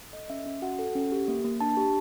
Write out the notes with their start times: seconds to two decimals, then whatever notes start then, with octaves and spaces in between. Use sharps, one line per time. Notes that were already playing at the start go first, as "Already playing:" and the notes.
0.13 A4 D#5
0.30 C#4 E5
0.46 C#4
0.62 F#4 F#5
0.79 A4
0.95 C#4
1.12 G4
1.28 A#3
1.44 A#3
1.60 D4 A5
1.77 G4